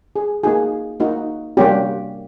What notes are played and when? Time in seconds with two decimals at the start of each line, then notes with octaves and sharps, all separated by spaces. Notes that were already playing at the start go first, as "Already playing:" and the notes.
0.16 G#4
0.43 A#3 D#4 F#4 G#4
1.00 A#3 D#4 F#4
1.57 G3 A#3 C#4 F#4 G4